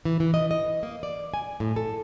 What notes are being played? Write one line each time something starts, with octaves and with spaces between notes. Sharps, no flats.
E3
E3
D#5
D#5
A#3
D5
G#5
A2
A4